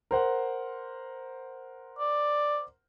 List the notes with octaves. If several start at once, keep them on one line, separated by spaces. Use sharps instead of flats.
A#4 C5 F#5
D5